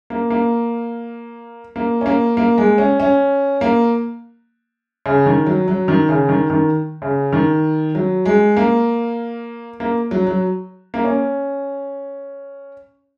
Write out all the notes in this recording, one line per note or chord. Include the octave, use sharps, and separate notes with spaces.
A#3
A#3
A#3
C#4
A#3
A#3
G#3
C#4
C#4
A#3
C#3
D#3
F#3
F#3
D#3
C#3
D#3
D#3
C#3
D#3
F#3
G#3
A#3
A#3
F#3
F#3
A#3
C#4